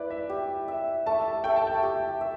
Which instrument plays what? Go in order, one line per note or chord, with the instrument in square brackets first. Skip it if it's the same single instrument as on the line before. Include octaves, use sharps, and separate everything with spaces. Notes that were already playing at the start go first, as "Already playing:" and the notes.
Already playing: [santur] E4 [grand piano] B4 D5
[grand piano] E5
[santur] G4
E5
[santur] A3 [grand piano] A5
[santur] A3 [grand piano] G5
[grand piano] A5
G5
[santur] G4
E5